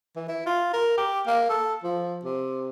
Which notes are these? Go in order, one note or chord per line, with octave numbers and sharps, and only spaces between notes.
E3
E4
F4
A#4
G4
A#3
A4
F3
C3